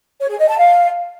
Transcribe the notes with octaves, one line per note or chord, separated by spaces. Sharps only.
C#5
G#4
D#5
A5
F5